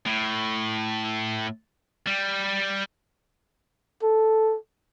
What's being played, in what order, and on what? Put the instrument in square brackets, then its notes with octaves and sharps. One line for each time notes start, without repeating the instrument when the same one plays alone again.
[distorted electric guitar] A2
G3
[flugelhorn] A4